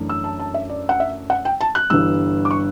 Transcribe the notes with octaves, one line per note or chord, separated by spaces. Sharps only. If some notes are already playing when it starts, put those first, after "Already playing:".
Already playing: F#2 E3 A3 D4
E6
A5
A5
E5
D5
F#5
E5
F#5
G5
A5
F#6
G1 G2 E3 G3 E6
D6
C#6